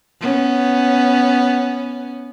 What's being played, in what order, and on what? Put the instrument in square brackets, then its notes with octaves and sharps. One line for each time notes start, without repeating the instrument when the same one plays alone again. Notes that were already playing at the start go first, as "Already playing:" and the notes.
[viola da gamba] B3 C#4